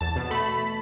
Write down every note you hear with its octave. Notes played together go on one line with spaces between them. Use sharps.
E2 A5
B2
A3 B5